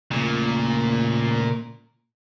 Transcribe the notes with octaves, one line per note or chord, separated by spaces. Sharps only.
A#2 C#3 A3